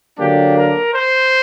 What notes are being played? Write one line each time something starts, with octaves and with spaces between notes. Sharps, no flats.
D3 F#3 A#3 D4 G4
A#4
C5